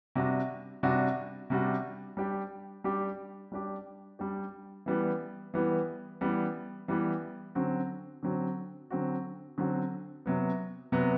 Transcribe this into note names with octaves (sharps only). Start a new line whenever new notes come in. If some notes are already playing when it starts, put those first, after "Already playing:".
C3 G3 D4 F#4
C3 G3 D4 F#4
C3 G3 D4 F#4
G3 D4 G4
G3 D4 G4
G3 D4 G4
G3 D4 G4
E3 G3 B3
E3 G3 B3
E3 G3 B3
E3 G3 B3
D3 F#3 C4 F#4
D3 F#3 C4 F#4
D3 F#3 C4 F#4
D3 F#3 C4 F#4
C3 F#3 B3
C3 F#3 B3